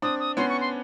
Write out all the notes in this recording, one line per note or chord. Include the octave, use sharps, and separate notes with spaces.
C4 D4 D#6
D#6
B3 C#4 C6
C#6
C6